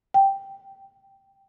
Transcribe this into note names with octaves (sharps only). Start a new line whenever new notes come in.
G5